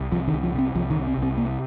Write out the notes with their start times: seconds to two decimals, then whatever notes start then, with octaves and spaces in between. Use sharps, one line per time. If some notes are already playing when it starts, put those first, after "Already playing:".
Already playing: C2
0.11 C3 F3
0.28 D#3
0.33 C2
0.43 F3
0.54 C3 C4
0.75 C2 F3
0.90 D#3
0.96 C3
1.07 C4
1.17 C2
1.22 C4
1.37 C3 A#3